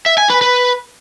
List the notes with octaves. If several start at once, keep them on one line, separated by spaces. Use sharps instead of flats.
E5
G#5
B4
B4